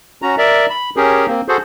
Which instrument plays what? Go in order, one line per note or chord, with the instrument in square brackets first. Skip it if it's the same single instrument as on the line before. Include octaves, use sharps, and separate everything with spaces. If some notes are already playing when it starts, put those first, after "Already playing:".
[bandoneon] C#4 F#4 A#5
A#4 D5 E5
B5
C#4 G4 G#4 A#4
A#3 C4
F#4 G#4 A4 C5